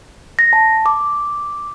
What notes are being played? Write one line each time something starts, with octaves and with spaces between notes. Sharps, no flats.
A#6
A5
D6